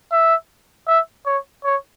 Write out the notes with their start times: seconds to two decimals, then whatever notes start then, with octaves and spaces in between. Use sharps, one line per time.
0.12 E5
0.88 E5
1.26 C#5
1.65 C#5